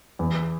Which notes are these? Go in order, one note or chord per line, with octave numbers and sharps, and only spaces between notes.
E2